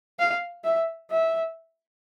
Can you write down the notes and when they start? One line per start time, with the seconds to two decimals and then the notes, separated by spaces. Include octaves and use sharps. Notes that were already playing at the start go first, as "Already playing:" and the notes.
0.19 F5
0.64 E5
1.11 E5